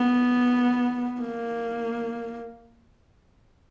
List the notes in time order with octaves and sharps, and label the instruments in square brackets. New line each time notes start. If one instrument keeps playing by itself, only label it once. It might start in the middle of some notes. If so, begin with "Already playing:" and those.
Already playing: [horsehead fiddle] B3
A#3